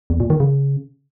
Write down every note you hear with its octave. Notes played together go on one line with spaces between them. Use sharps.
E2
A#2
D#3
C#3